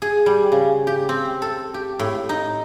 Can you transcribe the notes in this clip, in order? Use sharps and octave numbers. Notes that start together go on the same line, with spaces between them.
G#4
G3
C#3
G4
C4
A4
G4
A2
D#4